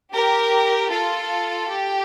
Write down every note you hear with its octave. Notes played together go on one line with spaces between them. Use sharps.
G4 A#4
F4 A4
G4